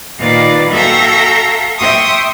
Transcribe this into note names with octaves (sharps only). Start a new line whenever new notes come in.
A#2 D#3 F4 B4 D5
F#4 A4 E5 F5 G5 A#5
E5 G5 C6 C#6 D#6